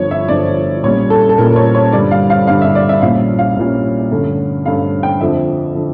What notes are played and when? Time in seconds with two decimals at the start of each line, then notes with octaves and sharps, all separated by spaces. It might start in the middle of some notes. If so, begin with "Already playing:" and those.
Already playing: G1 G2 F3 C#5
0.11 E5
0.28 G1 G2 F3 D5
0.84 A#1 A#2 G3 C#4 C#5
1.10 A4
1.29 A4
1.38 A#1 A#2 G3 C#4 A#4
1.52 A#4
1.56 C#5
1.75 C#5
1.92 G2 D3 G3 D4 D5
2.11 F5
2.30 F5
2.47 G2 D3 G3 D4 F5
2.62 E5
2.75 D5
2.89 E5
3.02 A#1 A#2 G3 C#4 F5
3.39 F5
3.57 A#1 A#2 G3 C#4
4.11 G2 D3 A3 C#4
4.66 G2 D3 A3 C#4 F5
5.03 G5
5.21 F2 D3 F3 E5
5.75 D3 F3